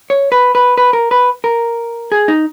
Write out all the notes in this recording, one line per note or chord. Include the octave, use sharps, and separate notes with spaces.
C#5
B4
B4
B4
A#4
B4
A#4
G#4
D#4